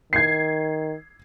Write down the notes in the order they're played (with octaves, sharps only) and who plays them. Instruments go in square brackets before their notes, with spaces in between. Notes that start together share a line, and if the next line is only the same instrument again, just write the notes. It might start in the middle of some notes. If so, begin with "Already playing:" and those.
[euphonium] D#3 [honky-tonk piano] G#6 C7